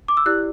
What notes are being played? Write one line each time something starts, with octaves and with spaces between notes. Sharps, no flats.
D6
E6
E4 G4 D5 F#6